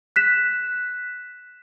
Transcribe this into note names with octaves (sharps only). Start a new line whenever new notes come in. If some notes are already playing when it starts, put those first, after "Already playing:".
F#6 B6 E7